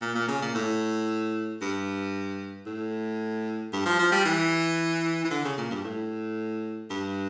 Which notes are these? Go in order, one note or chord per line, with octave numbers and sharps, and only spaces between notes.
A#2
A#2
C#3
A#2
A2
G2
A2
G2
F3
F3
G3
E3
E3
D3
C#3
A#2
G2
A2
G2